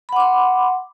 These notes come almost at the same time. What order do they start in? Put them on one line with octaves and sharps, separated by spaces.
B5 F#5 D6 C6